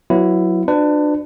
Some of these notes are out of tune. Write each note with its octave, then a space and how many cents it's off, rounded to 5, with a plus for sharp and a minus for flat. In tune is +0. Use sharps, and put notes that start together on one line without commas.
F#3 +0 B3 +0 E4 +15
D4 +20 F#4 -40 B4 +35